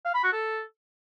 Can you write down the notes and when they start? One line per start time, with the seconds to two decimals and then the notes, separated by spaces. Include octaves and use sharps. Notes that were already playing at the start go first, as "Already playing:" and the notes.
0.05 F5
0.14 B5
0.24 F#4
0.33 A4